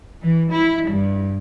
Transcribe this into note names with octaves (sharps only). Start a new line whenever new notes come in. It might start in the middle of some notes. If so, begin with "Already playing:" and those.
E3
E4
G2